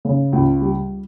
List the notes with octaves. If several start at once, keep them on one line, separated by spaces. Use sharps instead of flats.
C#3
C#2
G3